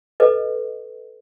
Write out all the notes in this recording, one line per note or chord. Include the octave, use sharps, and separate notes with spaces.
A4 B4 D#5